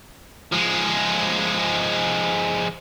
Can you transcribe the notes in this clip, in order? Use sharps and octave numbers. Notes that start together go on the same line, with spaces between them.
F3 G#3